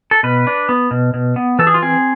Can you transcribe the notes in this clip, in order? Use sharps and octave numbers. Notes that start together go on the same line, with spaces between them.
A4
B2 B4
D4
B3
B2
B2
B3
E3 A4
G#4
F4
C4 G#4